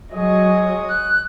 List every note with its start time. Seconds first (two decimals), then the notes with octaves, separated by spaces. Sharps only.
0.13 F#3 G#3 G#4 D#5 C#6 D#6
0.89 F#6